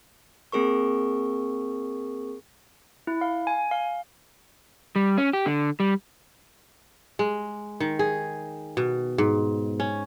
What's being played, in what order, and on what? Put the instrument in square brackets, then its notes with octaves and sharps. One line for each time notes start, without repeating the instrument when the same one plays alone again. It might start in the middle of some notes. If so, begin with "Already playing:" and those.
[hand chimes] A#3 C4 G#4 A#4 C#6
[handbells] E4
F5
G#5
F5
[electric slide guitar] G3
C#4
G4
D3
G3
[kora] G#3
D#3
G#4
B2
G#2
C#4